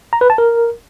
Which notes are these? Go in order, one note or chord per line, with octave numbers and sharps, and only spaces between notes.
A#5
B4
A5
A#4